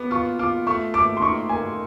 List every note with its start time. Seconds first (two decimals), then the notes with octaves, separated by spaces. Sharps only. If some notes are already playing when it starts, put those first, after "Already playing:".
Already playing: B3 D6
0.11 F4 C#6
0.39 F4 D6
0.67 A3 C#6
0.94 A3 D6
1.17 C6
1.22 D#4 C#6
1.49 A#3 G#5